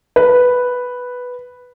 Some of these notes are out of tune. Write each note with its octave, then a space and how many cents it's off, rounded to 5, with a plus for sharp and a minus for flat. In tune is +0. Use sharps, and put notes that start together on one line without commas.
B4 +0